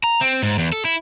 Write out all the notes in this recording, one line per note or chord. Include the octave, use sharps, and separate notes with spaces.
A#5
C4
G#2
E2
A4
E4